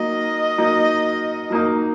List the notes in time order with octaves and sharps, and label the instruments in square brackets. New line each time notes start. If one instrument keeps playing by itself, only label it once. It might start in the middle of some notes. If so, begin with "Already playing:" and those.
Already playing: [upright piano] F#3 A#3 D#4 [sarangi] D#5
[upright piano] F#3 A#3 D#4
F#3 A#3 D#4